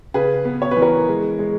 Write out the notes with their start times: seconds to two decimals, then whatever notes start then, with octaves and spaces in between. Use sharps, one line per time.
0.14 C#3 G#4 B4
0.45 B3
0.62 C#5
0.71 B4
0.77 E3
0.82 A#4 C#5
1.09 G#3
1.39 G#3